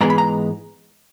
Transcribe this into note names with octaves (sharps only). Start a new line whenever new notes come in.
G#2 E3 G#3 B3 A#5
B5
A#5